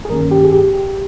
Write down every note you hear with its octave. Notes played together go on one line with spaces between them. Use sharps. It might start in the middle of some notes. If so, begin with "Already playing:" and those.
G#4
G2 D#3 A#3 C#4 A#4
G4
G#4
G4